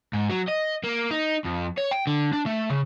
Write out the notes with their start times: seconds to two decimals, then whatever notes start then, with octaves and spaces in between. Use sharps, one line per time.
0.13 G#2
0.30 F#3
0.48 D#5
0.84 A#3
1.11 D#4
1.44 F2
1.77 C#5
1.91 G5
2.07 D3
2.33 D4
2.46 A3
2.70 C#3